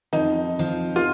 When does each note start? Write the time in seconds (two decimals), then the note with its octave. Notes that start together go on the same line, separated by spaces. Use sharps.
0.13 F2 D#4
0.59 F3
0.96 F4